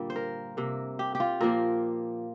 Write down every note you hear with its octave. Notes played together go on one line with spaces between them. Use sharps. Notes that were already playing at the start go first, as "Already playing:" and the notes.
Already playing: G2 A#2 D3 G3 A#3
C5
A#4
C3 A#3
G4
G4
F4
A#2 F3 A#3 A#4